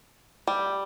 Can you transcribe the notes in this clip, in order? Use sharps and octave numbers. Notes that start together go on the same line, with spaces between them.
G3